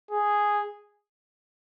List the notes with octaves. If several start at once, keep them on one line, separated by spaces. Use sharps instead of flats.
G#4